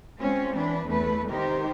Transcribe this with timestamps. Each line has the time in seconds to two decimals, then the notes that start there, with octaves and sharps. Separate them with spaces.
0.18 G#3 C4 C#4 F4
0.55 E3 D4 B4
0.85 E2 A3 B4
1.29 C3 D#3 D#4 G4 A#4 C5